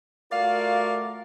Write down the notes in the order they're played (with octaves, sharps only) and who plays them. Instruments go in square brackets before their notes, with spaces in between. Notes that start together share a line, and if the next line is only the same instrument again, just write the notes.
[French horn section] A3 F4 A#4 [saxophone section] F#4 D5 F5